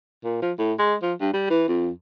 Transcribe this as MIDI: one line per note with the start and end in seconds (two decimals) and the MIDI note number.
0.24 0.39 46
0.42 0.52 53
0.58 0.73 45
0.79 0.95 56
1.02 1.13 53
1.20 1.32 43
1.33 1.46 55
1.50 1.68 52
1.68 1.90 41